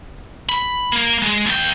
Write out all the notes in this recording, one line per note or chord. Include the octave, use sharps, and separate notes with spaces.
B5
A#3
G#3
D#2 G5